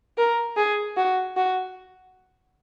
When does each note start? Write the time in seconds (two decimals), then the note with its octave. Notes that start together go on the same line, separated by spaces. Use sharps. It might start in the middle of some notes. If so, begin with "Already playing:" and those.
0.18 A#4
0.57 G#4
0.97 F#4
1.37 F#4